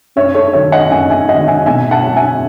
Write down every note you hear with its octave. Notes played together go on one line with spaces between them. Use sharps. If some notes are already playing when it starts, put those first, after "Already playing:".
F#2 C#5 E5
A4 C#5
D#3 F#3 C#5 E5
D#5 F#5
F#2 E5 G#5
E5 G#5
D#3 F#3 D#5 F#5
E5 G#5
B2 E5 G#5
F#5 A5
F#3
E5 G#5